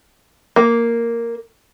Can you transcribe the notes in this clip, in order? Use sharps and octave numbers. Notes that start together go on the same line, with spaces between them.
A#3